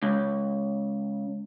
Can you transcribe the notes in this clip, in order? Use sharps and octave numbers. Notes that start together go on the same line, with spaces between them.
C#2